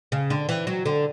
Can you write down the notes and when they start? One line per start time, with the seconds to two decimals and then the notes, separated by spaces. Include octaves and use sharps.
0.12 C#3
0.30 D3
0.49 E3
0.67 F#3
0.85 D3